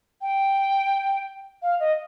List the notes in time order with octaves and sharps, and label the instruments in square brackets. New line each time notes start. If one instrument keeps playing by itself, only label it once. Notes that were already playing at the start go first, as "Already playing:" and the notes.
[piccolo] G5
F5
D#5